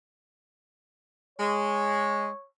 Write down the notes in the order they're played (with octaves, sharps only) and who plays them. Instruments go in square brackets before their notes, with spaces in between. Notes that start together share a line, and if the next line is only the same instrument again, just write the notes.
[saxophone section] G#3 [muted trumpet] C#5